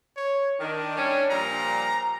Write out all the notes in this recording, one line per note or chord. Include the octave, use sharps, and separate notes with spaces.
C#5
D#3 D4
G3 C#4
A#2 F3 G3 A#5